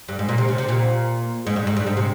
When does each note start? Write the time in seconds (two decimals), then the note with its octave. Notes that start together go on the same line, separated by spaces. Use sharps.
0.09 G2
0.19 G#2
0.29 A#2
0.38 C3
0.48 C#3
0.58 C3
0.69 A#2
1.47 G#2
1.56 G2
1.67 G#2
1.77 G2
1.87 G#2
1.97 C3